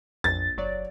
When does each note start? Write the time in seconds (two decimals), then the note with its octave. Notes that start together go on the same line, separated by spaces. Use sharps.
0.24 A#1 F2 A6
0.58 F#1 F#3 C#5 D5